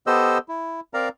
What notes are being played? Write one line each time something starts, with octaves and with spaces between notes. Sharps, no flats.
B3 G4 A4 C5 D#5 E6
E4
C4 A#4 D5 F5 A#5